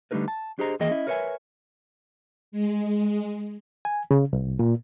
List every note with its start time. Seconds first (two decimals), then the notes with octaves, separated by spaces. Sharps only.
0.11 D3 G3 A3 D#4 A#4 B4
0.28 A5
0.59 D4 G4 G#4 C5 D#5 A#5
0.80 D#2 E3 A#3 G#4 D#5 G5
0.91 C#4 E4 D#5
1.07 A#4 B4 C#5 D5 E5 G#5
2.52 G#3
3.85 G#5
4.11 C#3
4.33 C2
4.59 A#2